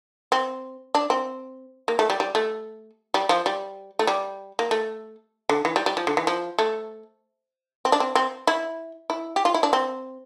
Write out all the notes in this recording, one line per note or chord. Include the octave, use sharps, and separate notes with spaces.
C4
D4
C4
A#3
A3
G3
G3
A3
G3
F3
G3
A3
G3
A#3
A3
D3
E3
G3
G3
F3
D3
E3
F3
A3
C4
D4
C4
C4
E4
E4
G4
F4
E4
D4
C4